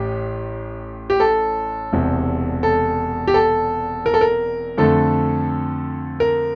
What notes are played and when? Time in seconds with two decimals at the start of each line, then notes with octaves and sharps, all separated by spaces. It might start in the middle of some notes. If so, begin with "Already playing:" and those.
Already playing: A1 A2 G4
1.10 G4
1.20 A4
1.93 E1 E2 C3
2.63 A4
3.27 G4
3.34 A4
4.06 A#4
4.14 A4
4.21 A#4
4.77 F2 D3 A3 A4
6.20 A#4